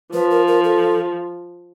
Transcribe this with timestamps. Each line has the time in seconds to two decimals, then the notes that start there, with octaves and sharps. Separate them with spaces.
0.13 F3 B4
0.31 A#4
0.48 A#4
0.64 A4